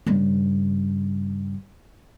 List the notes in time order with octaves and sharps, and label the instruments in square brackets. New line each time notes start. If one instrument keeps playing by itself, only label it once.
[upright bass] G2 C#3